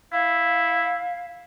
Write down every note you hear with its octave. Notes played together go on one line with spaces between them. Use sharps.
E4 F5